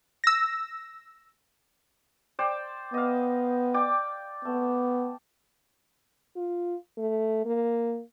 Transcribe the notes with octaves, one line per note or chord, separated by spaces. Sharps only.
E6 A#6
C5 D5 G5
B3 D#5 F5
D5 G5 D6
A3 B3
F4
A3
A#3